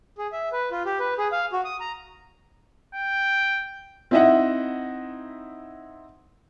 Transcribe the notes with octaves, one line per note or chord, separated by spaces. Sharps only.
G#4
E5
B4
F4
G4
B4
G#4
F5
F#4
D#6
A#5
G5
C4 D#4 E4 D#5 E5 F#5